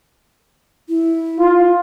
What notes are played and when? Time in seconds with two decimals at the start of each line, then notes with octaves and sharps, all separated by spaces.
0.89 E4
1.39 F4